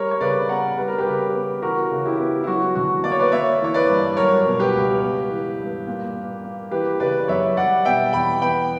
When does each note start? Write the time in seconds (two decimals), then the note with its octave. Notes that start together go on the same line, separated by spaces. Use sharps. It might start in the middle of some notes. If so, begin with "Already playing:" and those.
Already playing: G3 A#4 C#5
0.11 C#5
0.21 C#3 B4 D5
0.49 B3 F#5 A#5
0.78 G3 B4
0.88 A#4
0.98 G4 B4
1.06 C#3
1.34 B3
1.62 E3 F#4 A#4
1.91 C#3
2.06 E4 G4
2.19 B3
2.44 E4
2.47 F#3 F#4
2.75 D3 F#4
3.04 A#3 D5
3.12 C#5
3.20 B4 D5
3.32 A#3 C#5 E5
3.61 E3 C#5
3.74 B4 D5
3.89 G2
4.17 F#3 A#4 C#5
4.46 B2
4.59 G4 B4
4.75 C#2
5.03 B3
5.30 E3
5.59 G2
5.87 A#2
6.16 A#3
6.44 A#3
6.71 E3 G4 B4
7.00 C#3 B4 D5
7.28 F#2 C#5 E5
7.57 G3 D5 F#5
7.85 B2 E5 G5
8.13 E2 G5 B5
8.41 B3 G5 B5